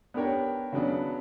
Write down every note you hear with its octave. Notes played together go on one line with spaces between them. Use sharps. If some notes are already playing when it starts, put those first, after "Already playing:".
B3 D4 G4 A#4 C#5
C#3 F#3 B3 D4